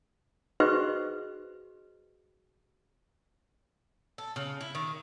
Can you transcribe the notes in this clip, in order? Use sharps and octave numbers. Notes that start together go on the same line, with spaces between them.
F#4 G#4 B4 C5 D#5 C#6
A4
C#3
E4
D#3